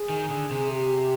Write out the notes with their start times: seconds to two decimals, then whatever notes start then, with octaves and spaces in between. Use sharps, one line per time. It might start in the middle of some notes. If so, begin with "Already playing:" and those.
Already playing: G#4
0.10 D#3
0.30 D3
0.51 C3
0.72 G4